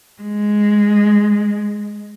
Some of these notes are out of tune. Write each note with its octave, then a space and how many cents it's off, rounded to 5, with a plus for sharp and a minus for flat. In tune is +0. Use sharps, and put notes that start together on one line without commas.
G#3 +0